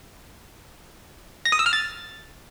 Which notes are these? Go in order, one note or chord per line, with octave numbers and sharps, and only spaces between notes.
A#6
D#6
E6
F6
A6